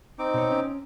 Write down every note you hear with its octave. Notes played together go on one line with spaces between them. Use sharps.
C4 D#4 D6
B2 C#5
C#4